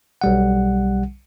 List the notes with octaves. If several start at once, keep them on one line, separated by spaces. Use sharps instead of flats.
B1 G3 F#5